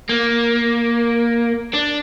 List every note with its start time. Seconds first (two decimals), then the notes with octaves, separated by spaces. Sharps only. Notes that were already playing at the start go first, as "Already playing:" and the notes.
0.10 A#3
1.74 D4